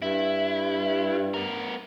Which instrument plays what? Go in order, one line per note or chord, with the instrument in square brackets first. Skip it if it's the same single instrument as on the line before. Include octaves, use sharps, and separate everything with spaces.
[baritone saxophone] G2 [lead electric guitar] E4
[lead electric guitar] B3 A#4